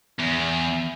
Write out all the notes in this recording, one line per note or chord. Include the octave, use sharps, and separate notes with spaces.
E2